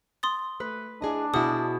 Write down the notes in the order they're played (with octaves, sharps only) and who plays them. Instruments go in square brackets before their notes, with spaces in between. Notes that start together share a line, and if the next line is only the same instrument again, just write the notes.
[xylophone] C6 D#6 A6
[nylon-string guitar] A3 [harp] B4
[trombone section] D4 [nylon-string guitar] E4 G#4 D#5
[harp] B2 [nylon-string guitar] E4 G#4 [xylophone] D#6